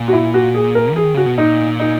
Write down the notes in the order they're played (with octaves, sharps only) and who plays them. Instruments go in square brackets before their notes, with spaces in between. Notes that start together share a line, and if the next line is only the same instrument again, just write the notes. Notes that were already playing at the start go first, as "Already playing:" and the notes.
Already playing: [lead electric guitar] A#2
[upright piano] F#4
E4
F#4
G#4
A#4
[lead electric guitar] E3 [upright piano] G#4
[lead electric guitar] D#3
[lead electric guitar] C#3 [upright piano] F#4
[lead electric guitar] B2
[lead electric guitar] A#2 [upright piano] D#4
[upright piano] D#4